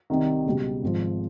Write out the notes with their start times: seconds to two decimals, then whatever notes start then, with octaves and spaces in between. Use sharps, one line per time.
0.10 C2 C3 D#3
0.46 C#2 B2 G3
0.82 G#1 G#2 F3